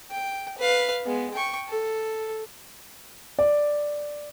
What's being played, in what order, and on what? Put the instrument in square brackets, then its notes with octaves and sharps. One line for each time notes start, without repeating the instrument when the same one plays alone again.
[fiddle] G5
B4 F5
G#3 B3
G5 C#6
A4
[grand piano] D5